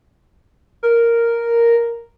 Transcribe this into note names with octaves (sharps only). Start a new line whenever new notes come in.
A#4